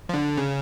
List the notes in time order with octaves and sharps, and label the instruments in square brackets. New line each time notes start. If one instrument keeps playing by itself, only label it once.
[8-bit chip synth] F3
D3
C#3